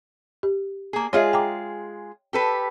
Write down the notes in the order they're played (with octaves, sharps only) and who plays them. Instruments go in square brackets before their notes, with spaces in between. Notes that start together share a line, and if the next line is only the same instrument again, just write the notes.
[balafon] G4
[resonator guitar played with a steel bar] A#3 G#4
[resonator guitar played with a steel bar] G#3 F4 G#4 [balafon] C#5 D#5 E5
[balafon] G5 A#5 D6
[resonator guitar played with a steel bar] G4 A4 B4